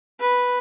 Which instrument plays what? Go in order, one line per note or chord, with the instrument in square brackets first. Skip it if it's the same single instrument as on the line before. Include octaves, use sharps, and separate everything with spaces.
[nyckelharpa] B4